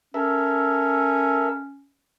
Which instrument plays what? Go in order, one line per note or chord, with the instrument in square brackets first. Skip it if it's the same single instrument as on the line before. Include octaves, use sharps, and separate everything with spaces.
[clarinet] C#4 [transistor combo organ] A4 A#4 E5